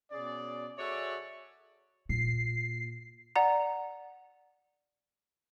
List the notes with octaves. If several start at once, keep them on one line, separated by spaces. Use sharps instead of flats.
B2 C#4 G#4 D5
F#4 G#4 A4 C#5 D5 E5
A#2 C7
D5 F#5 A#5